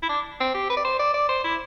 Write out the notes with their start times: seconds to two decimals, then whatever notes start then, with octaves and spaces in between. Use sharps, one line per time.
0.03 E4
0.09 D4
0.40 C4
0.54 G4
0.70 B4
0.77 D5
0.85 C5
0.99 D5
1.14 D5
1.29 C5
1.44 E4